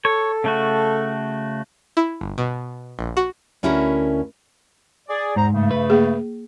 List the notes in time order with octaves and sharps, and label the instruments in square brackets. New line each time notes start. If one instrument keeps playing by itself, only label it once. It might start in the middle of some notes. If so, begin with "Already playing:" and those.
[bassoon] A4 [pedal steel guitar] C#5
[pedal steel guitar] C#3 A3 F#4
[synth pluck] E4
G1
B2
A#1
F#4
[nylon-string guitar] D2 C#4 E4 F#4 A#4
[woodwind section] G#4 D5
[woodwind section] E2 C5 A#5 [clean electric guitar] G#2
[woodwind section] G2 C#3 A3
[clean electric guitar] B4
[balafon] A#3 G#4